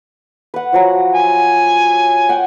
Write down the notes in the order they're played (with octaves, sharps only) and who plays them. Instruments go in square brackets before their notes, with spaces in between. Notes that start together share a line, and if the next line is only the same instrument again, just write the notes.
[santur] B4 F#5
F3 F#3 A#5
[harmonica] G#5
[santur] F#5 G5